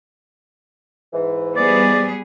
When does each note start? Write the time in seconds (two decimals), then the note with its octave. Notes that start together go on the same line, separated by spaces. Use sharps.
1.13 G#2 E3
1.56 G3 B3 G#4 D5